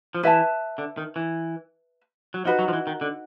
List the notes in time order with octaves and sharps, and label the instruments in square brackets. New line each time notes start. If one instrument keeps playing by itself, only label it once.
[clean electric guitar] F3
[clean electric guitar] E3 [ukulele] B4 E5 A5
[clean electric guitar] D3
D#3
E3
F#3
[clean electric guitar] F3 [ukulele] D#4 F#4 B4
[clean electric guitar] F#3
F3
E3
D#3
D3